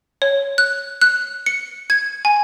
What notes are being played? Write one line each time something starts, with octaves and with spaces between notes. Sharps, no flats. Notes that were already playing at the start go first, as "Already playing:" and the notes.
C#5
F#6
F#6
C#7
G#6
G#5